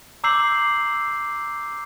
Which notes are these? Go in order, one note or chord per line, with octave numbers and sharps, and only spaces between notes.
A#5 D6 E6 G6 C7 F#7